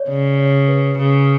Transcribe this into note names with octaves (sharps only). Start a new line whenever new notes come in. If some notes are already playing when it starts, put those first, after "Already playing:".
Already playing: C#5 D5
C#3
C#5
B4
C#3